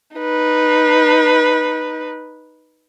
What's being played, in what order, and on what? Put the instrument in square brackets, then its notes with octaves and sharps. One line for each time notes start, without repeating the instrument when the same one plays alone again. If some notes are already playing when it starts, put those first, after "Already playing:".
[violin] D#4 B4